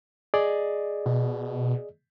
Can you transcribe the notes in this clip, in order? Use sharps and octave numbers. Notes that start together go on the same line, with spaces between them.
G#4 D5 D#5
B2